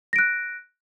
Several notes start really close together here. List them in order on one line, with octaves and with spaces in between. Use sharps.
A#6 D7 F#6